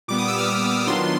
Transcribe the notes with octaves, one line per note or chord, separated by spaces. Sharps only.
A#2 G3 B3 D6
D#6
E6
F6
E6
D#3 F#3 B3 D4 F4 C6